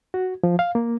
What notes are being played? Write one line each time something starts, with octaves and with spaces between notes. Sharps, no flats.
F#4
F3
F5
A#3